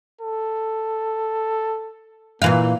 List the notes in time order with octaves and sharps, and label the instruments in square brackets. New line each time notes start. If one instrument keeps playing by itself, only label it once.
[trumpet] A4
[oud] A#2 E3 F5 [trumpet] A#3